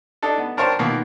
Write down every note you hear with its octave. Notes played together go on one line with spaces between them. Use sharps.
D4 D#4 A4
B3
D4 A#4 C5 C#5 G5 A5
B2 D#3 A#3